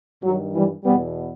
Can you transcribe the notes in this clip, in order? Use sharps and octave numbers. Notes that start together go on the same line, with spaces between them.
G2 D#3 F#3
E3 G3
E2 B2 G3 B3